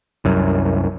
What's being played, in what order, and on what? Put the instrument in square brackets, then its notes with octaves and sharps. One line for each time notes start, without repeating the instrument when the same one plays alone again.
[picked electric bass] C2 F#2